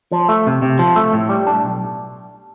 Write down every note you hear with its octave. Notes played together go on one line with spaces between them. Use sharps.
F3
A3
C3
C3
F3
A3
A2
G3
D4
B1